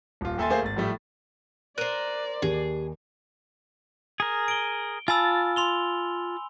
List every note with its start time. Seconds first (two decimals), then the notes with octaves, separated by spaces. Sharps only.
0.21 D#1 F4
0.38 D#2 A4 E5 G#5 C6 A6
0.50 A3 A#3 G#4 C5 F5
0.62 G#1 A6
0.76 A2 F3 G3 A3
1.78 A#4 C5 D5 F#6 D#7
2.42 D#2 G4 G#4
4.20 G#4 A#4
4.48 D7 G7
5.08 F4 G#5 A5 B5 E6
5.56 C6 F7 G7